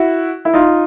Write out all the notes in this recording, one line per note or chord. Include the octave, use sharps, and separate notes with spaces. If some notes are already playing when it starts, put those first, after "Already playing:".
Already playing: E4 F#4
E4
D#4 F4